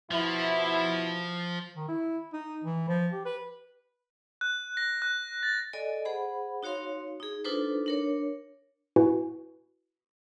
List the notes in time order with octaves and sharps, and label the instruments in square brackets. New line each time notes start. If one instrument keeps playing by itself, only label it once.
[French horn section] B2 E4 [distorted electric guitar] F3
[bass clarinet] D#3
E4
D#4
E3
F3
G4
B4
[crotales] F#6
A#6
F#6
A6
[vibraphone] A4 D5 D#5 G#5
G#4 C5 F#5 B5
D#4 F#4 C#5 F5 C6
D#4 G#4
D4 D#4 F4 A4 B4 C5
D4 A#4 C#5
[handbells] E4 F#4 B4 G#5